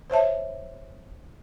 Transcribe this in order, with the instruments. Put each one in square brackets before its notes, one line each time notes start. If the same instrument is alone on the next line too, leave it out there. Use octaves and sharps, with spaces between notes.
[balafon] C5 C#5 E5 A5